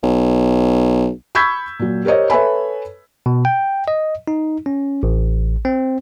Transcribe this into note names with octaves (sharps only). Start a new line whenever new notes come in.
B1
B5 C#6 E6 G6 G#6 B6
A#2 F#3
G4 A#4 C5 C#5 D#5
A4 B4 C#5 E5 G#5 B5
B2
G5
D#5
D#4
C#4
A1
C4